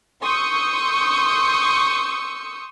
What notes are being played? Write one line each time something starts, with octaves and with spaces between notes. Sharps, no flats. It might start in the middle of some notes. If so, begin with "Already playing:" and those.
C6 C#6 D#6 E6 G6 C#7